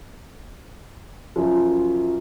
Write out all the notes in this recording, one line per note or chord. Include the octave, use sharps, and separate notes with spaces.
F#2 F3